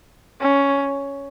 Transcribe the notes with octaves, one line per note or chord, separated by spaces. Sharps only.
C#4